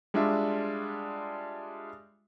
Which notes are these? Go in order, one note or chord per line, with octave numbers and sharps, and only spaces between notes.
G3 G#3 D4 F4 D5 E5